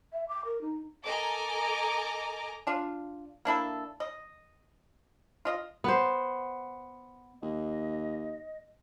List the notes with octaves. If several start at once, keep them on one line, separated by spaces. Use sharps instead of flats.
E5
D6
A#4
D#4
A4 A#4 D#5 G#5 A#5 D6
D4 F4
A#3 D4 E4 A4
D#5
F4 D#5
B3 C5
D#2 D#5